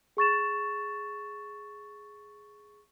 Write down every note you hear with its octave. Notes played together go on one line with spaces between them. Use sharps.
G#4 C#6 A6 E7